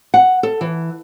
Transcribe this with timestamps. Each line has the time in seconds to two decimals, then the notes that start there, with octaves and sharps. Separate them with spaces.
0.14 F#5
0.43 A4
0.61 E3